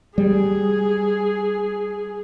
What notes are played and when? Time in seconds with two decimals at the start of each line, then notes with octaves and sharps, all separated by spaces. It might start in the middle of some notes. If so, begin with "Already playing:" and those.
0.18 G3 G#4